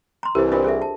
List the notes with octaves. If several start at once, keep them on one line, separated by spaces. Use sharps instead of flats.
A#5 C6
C2 E3 G4 C5
D4 F4 A#4 C5 D#5
G#4 A4 E5
A5